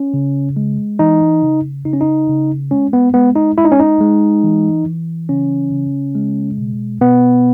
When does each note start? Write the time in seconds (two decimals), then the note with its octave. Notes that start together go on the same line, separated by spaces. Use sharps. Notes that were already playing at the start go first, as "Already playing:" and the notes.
Already playing: C#4
0.14 C#3
0.57 G#3
0.99 E3 D#4
1.42 C#3
1.85 C#3 D#4
1.93 C#4
2.01 D#4
2.29 C#3
2.71 G#3 C#4
2.93 B3
3.14 G#3 B3
3.36 D#4
3.57 G#3 E4
3.65 D#4
3.72 C#4
3.79 D#4
4.00 G#3
4.44 E3
4.86 E3
5.29 C#3 C#4
5.72 C#3
6.15 G#3
6.58 B2
7.01 B2 B3